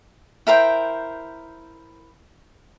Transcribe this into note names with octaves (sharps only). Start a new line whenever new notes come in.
E4 A#4 C5 G5